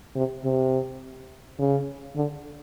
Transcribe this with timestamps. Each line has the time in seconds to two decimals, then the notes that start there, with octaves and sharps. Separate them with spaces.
0.16 C3
0.45 C3
1.59 C#3
2.16 D3